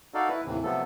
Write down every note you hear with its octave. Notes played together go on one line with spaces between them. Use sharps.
D#4 F#4 A4 D5 F5
E4 B4
D#2 A2 C3 E3
C3 F3 F#3 A3 B3 A4